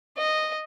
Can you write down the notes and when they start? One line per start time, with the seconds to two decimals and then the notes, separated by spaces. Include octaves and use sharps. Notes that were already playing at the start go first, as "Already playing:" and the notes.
0.17 D#5